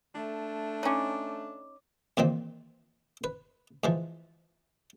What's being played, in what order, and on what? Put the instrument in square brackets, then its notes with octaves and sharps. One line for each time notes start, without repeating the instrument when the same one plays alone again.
[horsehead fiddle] A3 [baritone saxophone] D4
[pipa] C#4 D#4 [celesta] C#5 D6
[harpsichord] E2 A#2 D#3 C4
B4
G#2 E3 F3